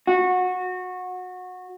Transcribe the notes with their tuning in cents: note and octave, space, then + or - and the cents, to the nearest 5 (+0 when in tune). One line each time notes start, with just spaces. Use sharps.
F#4 -20